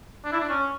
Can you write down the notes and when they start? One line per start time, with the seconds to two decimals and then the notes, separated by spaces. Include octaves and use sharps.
0.25 D4
0.32 E4
0.40 D4
0.49 C#4